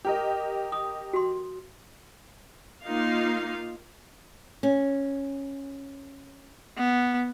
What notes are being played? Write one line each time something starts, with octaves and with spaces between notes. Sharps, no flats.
G4 A#4 D#5
D#6
F#4 C6
A#3 D#4 F4 F5
C#4
B3